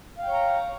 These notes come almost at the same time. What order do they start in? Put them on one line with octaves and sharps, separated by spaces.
F5 G5 C#5 A#5